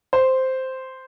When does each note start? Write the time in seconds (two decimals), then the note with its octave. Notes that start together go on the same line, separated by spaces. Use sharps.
0.13 C5